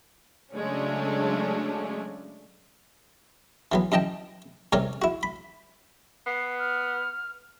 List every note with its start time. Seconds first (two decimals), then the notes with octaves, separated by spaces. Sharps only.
0.54 C#3 F#3 G#3 A3 C#4 D4
3.72 E3 F#3 B3
3.92 F#2 E3 D#5 G5 A5
4.72 C2 C3 G4 A#4 C#5 D5
5.02 E4 F#4
5.23 B5
6.26 B3 C7
6.59 F6